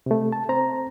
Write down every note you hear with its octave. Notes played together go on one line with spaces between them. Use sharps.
C3 A3
A5
C4 C5 A#5